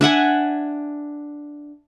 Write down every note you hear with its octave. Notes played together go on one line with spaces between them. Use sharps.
D4 E5 F#5 G#5